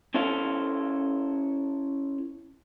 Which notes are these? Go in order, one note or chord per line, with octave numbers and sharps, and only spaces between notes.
C#4 E4 A4 C5 F5